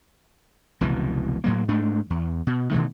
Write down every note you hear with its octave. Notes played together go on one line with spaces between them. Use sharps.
F1 C#2 B2 E3
A2 F#3 A#3
G#2 A3 D4
E2
B2
B2 D#3 E3 A3